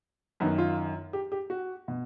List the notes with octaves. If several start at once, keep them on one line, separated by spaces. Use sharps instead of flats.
F#2 D#3 B3
F4
G4
G4
F#4
B2